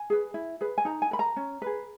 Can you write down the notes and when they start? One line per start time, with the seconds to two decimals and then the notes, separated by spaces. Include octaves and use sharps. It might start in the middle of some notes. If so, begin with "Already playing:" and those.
Already playing: G#5
0.10 G#4 B4
0.34 E4
0.61 G#4 B4
0.78 G#5
0.85 D#4 A#5
1.02 G#5
1.11 A#4 B5
1.19 A#5
1.36 C#4
1.62 G#4 B4